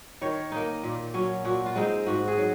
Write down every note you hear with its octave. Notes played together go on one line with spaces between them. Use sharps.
D#3 C#5
A#3 D#4
A#2
F#3 C#4
A#2 F#4
F4
G#3 C4 D#4
G#2 F#4
G#4
F#3